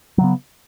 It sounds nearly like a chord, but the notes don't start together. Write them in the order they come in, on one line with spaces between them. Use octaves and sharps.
F#3 C#3 B3